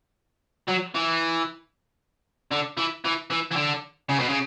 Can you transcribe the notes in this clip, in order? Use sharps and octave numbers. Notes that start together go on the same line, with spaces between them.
F#3
E3
D3
E3
E3
E3
E3
D3
C#3
B2
C#3